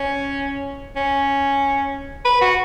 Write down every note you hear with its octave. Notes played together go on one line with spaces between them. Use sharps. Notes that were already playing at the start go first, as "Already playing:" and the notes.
Already playing: C#4
C#4
B4
F#4